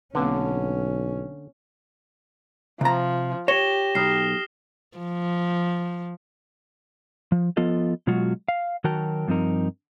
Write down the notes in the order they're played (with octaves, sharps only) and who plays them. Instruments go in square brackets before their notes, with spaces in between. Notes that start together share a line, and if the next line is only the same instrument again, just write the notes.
[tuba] B1 [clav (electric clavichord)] D3 [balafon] A#3 C4 B4 [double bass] C#4
[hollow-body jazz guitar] C3 A#5 [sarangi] F3
[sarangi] G4 [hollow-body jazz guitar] C#5 [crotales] A#6 E7 G7
[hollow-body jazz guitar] B1 [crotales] D#6 F6 C7
[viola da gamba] F3
[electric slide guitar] F3
F3 B3 F4 A4 D#5
B2 F#3 G#3 F4 F#4
F5
D#3 F#3 F#4 A#4 G5 A5
G2 F3 C4 D#4 A#4